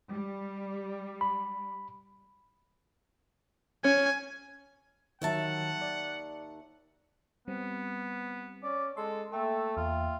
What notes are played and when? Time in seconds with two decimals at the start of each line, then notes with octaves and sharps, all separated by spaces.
0.10 G3
1.21 B5
3.84 C#4 G#5
5.22 D#2 D#3 F#3 E5 F#5 A5
5.82 D5
7.48 G3 B3 C4
8.63 C#4 D5
8.97 G#3 A4 C6
9.32 A3 A#3 A4 E5 G5
9.77 E2 F4